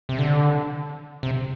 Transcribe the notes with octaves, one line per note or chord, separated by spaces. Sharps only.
C3
D3
C3